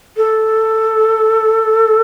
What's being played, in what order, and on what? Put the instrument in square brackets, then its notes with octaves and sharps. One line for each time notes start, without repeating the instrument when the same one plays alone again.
[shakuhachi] A4